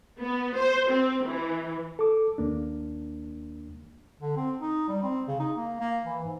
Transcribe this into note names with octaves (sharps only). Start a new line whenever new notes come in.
B3
C5
C4
E3
A4 D6
D#2 A#3 D4
D3
C4
D#4
G3
C4
C#3
D#4
A#3
A#3
E3
G#2